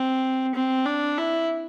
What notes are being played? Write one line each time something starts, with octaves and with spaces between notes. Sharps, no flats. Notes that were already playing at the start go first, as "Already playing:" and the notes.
Already playing: C4
C4
D4
E4